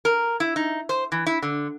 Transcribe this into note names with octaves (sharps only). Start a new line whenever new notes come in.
A#4
E4
D#4
C5
E3
E4
D3